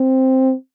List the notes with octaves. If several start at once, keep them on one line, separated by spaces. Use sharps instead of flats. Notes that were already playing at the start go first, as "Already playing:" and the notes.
Already playing: C4